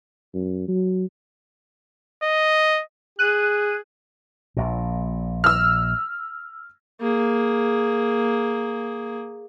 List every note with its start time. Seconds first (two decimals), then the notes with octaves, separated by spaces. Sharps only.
0.34 F#2
0.68 F#3
2.23 D#5
3.19 G#4 F#6 D#7
4.57 A#1 A#2
5.44 E6 F6
7.01 A#3 G#4